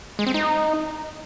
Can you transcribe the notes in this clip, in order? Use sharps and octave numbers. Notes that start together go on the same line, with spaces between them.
G#3
C4
D#4